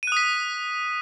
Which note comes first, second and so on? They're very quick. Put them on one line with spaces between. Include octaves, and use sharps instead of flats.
D#7 F#6 D#6 B6